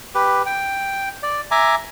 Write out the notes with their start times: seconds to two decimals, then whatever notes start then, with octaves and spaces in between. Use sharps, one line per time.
0.15 G4 B4
0.46 G5
1.23 D5
1.51 E5 G#5 A#5 D6